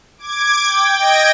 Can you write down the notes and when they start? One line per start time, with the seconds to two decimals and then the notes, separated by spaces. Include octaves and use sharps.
0.18 D6 G#6
0.62 G5
0.98 D#5 G5 G#6 A#6 D7